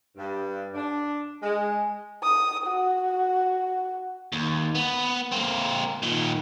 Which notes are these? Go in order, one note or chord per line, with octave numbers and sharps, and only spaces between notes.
G2
D4
G#3
D#6
F#4
D#2
B3
A#3 C4
A#2 D#3